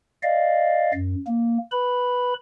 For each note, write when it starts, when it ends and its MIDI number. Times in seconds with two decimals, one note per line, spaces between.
0.23 0.92 74
0.23 0.92 75
0.23 0.92 77
0.94 1.15 42
1.27 1.58 58
1.72 2.34 71
1.72 2.34 83